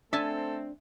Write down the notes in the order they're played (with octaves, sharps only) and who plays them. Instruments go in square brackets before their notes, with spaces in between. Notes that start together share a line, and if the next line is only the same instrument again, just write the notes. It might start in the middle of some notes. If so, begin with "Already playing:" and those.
[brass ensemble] A3 C4 [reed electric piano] D4 [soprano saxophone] A4 [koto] E5 G#5 A5